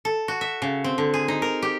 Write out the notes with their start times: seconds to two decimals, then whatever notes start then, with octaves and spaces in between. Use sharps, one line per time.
0.05 A4
0.28 F#4
0.41 E5
0.62 C#3
0.84 C4
0.98 D3
1.14 G#4
1.28 D#4
1.42 A#4
1.62 G4